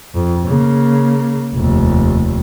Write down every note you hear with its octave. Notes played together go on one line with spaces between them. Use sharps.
F2
C#3 A#3
F1 D#2